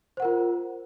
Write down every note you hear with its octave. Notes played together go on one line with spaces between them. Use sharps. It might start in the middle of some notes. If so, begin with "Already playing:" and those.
F4 A#4 C5 F#5